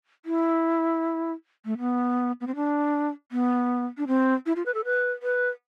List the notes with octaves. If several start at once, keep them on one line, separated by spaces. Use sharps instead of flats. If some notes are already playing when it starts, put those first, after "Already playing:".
E4
A3
B3
B3
C4
D4
B3
D4
C4
E4
F4
B4
A4
B4
B4